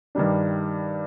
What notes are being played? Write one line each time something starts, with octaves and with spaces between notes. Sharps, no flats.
G2 D#3 G3 D4